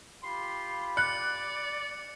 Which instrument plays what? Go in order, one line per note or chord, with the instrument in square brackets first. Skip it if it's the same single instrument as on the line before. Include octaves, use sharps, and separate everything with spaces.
[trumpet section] F4 G4 B5 [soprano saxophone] C6
[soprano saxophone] D5 [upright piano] F#6 [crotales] C#7